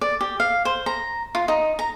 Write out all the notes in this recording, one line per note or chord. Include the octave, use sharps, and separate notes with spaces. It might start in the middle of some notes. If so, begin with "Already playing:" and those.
D5
G4
F5
C5
A#5
F4
D#4
A#5